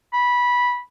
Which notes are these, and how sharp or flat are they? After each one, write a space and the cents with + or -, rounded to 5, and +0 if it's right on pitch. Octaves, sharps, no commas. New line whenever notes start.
B5 -15